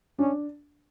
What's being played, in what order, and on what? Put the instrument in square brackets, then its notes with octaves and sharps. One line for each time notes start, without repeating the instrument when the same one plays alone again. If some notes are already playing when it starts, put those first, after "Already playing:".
[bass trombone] C#4 [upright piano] D4